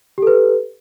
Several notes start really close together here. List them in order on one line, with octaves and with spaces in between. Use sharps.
G4 A4 B4